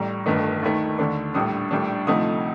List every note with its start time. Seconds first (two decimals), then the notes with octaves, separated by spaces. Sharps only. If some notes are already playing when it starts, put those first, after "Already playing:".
Already playing: A1 A2 G3 A#5
0.26 G1 G2 D#3 A3 D#4
0.62 D#2 D#3 A3
0.99 D#2 D3 A3 D4
1.34 A#1 A2 G3 D4 D#6
1.71 A#1 A2 G3 D4
2.07 D2 C3 F3 A3 D#4 D#6